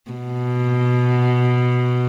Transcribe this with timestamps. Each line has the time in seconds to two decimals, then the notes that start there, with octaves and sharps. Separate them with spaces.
0.11 B2